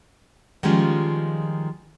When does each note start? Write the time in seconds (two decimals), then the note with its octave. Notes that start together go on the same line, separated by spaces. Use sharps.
0.63 D#3 F3 G3 G#3 C#4 F4